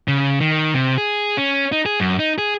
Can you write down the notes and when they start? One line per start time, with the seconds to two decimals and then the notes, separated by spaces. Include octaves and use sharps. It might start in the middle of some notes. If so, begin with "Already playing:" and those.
0.08 C#3
0.40 D#3
0.74 C3
0.98 G#4
1.37 C#4
1.72 D#4
1.86 G#4
2.00 F#2
2.19 D#4
2.38 G#4